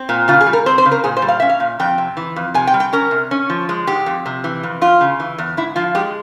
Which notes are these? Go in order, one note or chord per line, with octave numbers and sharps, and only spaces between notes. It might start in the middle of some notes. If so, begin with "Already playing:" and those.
Already playing: C4
A#2
C#3 F4
G#4
G3
A#4
C4 C5
C5
C#3
A#4
A#2 G#4
C5
G3
F5
C#4 E5
F5
A#2
F2 G5
C3
E3
F2
C3 G#5
G5
G3
G5
C#4 A#4
C3
C#4
F3
G#3
G#2 G4
F2
C3
E3
F2
E2 F4
C#3
E3
E2
G#2 E4
F3 F4
G#3 G4